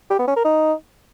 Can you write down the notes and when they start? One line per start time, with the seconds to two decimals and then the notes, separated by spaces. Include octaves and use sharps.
0.10 G4
0.19 B3
0.28 C#4
0.36 A#4
0.45 D#4